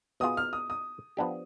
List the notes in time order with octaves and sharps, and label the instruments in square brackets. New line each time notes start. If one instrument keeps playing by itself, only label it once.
[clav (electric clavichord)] B2 B3 F4 G#4 [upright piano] D#6
[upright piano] F6
D#6
D#6
[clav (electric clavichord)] F3 B3 D4 G4